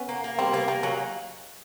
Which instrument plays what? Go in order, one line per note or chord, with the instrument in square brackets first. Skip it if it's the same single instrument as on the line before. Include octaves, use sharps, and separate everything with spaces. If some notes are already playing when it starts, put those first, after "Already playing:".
Already playing: [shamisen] B3 C#4
[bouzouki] A#3
A#3
[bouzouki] G3 [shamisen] C4
[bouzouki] A#3 [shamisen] B3
[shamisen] G3 [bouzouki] A#3
[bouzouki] F#3 [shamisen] G#3